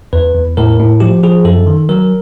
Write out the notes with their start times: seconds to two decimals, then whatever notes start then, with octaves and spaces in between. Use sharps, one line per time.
0.13 E2 B4
0.35 E2
0.57 A2 A#4
0.80 A2
1.00 F3 G4
1.23 F3 G#4
1.45 F#2 A4
1.67 D#3
1.89 F#3 A#4